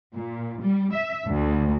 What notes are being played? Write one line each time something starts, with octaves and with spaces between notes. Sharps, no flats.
A#2
G3
E5
D2